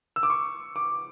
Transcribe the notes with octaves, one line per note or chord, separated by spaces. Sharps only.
E6
D6
C#6
D6